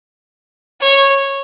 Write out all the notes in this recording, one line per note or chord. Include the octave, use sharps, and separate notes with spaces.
C#5